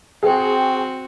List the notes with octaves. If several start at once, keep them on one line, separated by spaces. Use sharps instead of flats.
C4 F#4 G#4 G5